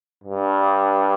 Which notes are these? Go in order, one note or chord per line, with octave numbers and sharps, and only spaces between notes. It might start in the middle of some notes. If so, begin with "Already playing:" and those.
G2